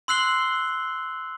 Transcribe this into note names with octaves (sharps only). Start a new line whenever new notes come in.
C6 E6 F#6 C7 F#7 G7